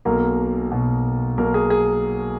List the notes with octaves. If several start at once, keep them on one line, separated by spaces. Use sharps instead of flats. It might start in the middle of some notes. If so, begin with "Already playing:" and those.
B1 B2 F#3 A#3 A#4
B1 B2 F#3
B1 B2 F#3 A#3 A#4
G#4
G#4